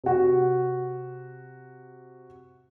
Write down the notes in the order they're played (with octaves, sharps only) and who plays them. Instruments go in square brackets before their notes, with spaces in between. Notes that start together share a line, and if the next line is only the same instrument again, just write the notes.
[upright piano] C3 F#4